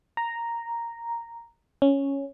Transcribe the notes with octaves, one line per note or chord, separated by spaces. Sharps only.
A#5
C#4